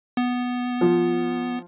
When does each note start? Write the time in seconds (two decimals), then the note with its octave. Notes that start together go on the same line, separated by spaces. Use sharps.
0.17 B3
0.81 F3